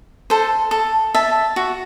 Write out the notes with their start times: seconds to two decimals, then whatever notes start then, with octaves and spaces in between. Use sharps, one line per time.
0.30 A4 C5
0.71 A4
1.15 E5 A5
1.56 F#4